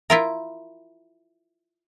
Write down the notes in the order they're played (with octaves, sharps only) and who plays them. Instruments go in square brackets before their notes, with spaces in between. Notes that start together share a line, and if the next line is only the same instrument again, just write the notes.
[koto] E4 F4 A#4 [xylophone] E5